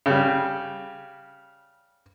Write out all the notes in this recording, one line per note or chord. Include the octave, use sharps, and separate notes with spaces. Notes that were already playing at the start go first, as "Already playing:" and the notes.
C#3 G3